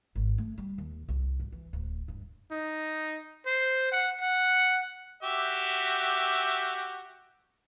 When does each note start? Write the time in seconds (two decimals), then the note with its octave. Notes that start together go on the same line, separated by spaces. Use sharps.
0.16 G#1
0.38 A3
0.58 G3
0.78 D#2
1.09 C2
1.40 G2
1.52 E3
1.73 D1
2.08 G2
2.52 D#4
3.47 C5
3.92 F#5
4.21 F#5
5.23 F#4 G4 E5